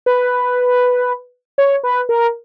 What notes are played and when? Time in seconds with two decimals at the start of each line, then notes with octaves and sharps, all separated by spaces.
0.06 B4
1.58 C#5
1.84 B4
2.09 A#4